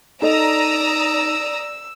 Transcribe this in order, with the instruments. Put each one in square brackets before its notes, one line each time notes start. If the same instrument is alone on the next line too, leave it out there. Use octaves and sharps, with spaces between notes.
[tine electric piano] D#4 [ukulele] A4 D#5 [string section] D5 A#5 D#6 [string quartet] E6